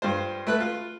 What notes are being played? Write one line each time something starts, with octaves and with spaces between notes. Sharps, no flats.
G2 F4 C5
A3 B4 F#6
F4